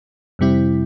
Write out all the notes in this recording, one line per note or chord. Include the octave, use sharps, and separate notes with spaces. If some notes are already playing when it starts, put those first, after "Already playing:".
F2 C3 G3 C4 E4